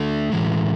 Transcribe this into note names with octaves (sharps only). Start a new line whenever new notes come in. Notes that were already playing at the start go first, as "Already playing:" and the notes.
Already playing: D3 A3
A2 E3 G#3